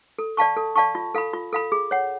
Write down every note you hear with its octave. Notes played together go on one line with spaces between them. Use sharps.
A4
D5 F5 A5 C#6
A4
D5 F5 A5 C#6
F4
A4 F5 B5
F4
A4 F5 B5
G#4
C#5 F#5